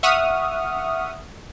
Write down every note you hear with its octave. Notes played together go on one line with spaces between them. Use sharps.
E5 F#5 C#6 D#6 F6